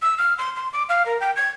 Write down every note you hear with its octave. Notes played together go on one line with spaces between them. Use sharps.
E6
F6
C6
C6
D6
F5
A#4
G5
G#6